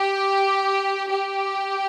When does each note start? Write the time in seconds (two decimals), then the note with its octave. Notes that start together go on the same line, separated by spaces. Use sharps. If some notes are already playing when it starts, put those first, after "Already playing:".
Already playing: G4
1.08 G4